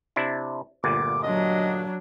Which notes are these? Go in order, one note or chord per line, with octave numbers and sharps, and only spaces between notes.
C3 D4 E4
G1 D2 A#2 D6
F#3 D4 D#5